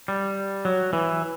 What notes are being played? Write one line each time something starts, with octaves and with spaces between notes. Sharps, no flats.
G3
F#3
E3